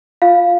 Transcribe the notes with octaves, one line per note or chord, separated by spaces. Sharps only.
F4 F5